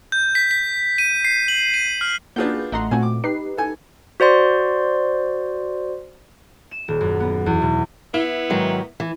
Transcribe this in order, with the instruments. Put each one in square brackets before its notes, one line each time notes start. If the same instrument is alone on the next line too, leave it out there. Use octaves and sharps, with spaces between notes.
[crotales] G6
B6
B6
D#7
C7
F#7
D#7
F6
[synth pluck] A#3 G#4 B4 [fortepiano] D4 F4 F#4 [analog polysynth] G6
[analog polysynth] A1 A#5 C6 [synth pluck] A3 D#5 F#5
[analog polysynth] A#2 [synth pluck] A3 C4 F#4 [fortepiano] G#5
[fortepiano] D6
[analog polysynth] D#4 G4 B4 [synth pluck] C7
[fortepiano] A4 G#5
[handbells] F#4 C5 D5 C6
[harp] E7
D#1
F#2
B3
E2
B2
[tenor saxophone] B3 [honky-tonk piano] E4
[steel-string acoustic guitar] G#2 D#3 F#3
E3